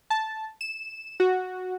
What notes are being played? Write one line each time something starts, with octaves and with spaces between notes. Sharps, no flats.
A5
E7
F#4